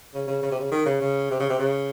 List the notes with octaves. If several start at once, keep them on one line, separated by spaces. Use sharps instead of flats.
C#3
C#3
C#3
C3
C#3
D#3
C#3
C#3
C3
C#3
C3
C#3